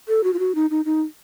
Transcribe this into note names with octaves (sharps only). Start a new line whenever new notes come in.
A4
F#4
F4
F#4
D#4
D#4
D#4